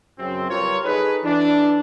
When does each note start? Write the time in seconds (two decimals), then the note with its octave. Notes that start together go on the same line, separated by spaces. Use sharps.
0.19 F#2 C#3 F#3 C4
0.49 G3 F4 A#4 B4 C#5
0.85 D#4 G#4 A4 B4
1.24 E3 D4